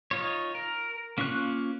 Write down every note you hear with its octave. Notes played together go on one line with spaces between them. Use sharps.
D#4 F4 C#5
A#4
A#3 C#4 F4 C#6 F#6